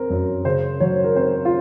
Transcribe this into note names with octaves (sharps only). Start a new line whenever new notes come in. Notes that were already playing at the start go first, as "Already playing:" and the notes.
Already playing: C4 A#4
F#2
C#3 C5
F#3 C#5
A#4
C4 C5
F4